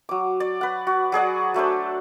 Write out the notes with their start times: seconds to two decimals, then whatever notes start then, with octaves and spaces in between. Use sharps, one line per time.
0.09 F#3 D6
0.40 D5
0.61 B4 F#5
0.87 F#4
1.12 F#3 G#4 D5 F#5
1.54 F#3 A3 D4 C5